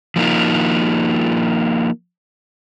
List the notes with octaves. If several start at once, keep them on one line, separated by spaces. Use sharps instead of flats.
F3 A#3 D#4 F4